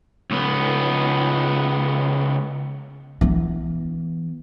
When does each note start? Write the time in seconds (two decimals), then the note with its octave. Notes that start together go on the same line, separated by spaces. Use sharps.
0.31 C#2 B3
3.21 E3 B3